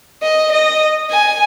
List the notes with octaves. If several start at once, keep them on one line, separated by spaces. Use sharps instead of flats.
D#5
D#5
G#5